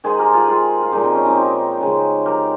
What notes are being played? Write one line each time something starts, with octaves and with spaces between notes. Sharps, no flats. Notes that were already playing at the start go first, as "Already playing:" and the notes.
D#3 G#3 G#4 C5
G4 A#4
F4 G#4
F4 G#4
F4
A#2 F3 G#3 D#4 G4
C4 D#4
C#4
C4 D#4
D#4 G4
C#3 G#3
G4 A#4